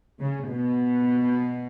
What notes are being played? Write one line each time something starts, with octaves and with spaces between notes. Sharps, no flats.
C#3
B2